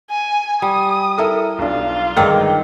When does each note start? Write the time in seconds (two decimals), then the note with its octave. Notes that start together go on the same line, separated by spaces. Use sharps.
0.10 G#5
0.62 G3 D#6
1.18 E4 A4 A#4
1.59 B1 D4 F4
2.16 G1 D#3 G#3 C4 D5 F6